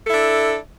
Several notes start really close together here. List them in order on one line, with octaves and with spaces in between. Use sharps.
A4 E4 D4